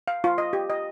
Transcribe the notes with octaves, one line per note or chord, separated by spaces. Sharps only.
F5
F4
D#5
G4
D#5